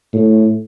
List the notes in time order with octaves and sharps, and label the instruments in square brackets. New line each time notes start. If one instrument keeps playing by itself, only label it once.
[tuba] A2